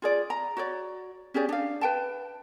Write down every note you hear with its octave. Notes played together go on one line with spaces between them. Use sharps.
F4 G#4 D5
A#5
F#4 C#5 D5
C#4 G4 G#4 D5
D4 F5
B4 G5 A5